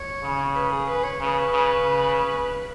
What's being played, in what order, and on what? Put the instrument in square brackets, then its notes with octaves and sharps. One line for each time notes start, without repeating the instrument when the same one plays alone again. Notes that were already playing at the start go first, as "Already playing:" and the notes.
Already playing: [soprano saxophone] C#5
[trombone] C#3
[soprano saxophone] B4
G#4
B4
C#5
[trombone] C#3 [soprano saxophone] B4
[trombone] C#3
C#3